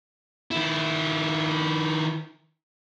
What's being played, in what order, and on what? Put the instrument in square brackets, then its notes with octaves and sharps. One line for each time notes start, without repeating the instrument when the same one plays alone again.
[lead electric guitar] D#3 E4